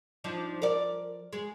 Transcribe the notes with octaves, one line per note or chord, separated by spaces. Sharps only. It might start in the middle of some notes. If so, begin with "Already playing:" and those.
F3 D4 D#4
A#4 D5
G#3